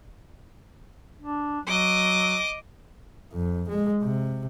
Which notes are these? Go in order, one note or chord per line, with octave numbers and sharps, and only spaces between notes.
D4
F#3 D#5 D6
F2
G#3
C3